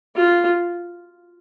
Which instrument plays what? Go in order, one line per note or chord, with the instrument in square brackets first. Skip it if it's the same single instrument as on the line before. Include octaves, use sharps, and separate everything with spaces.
[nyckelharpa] F4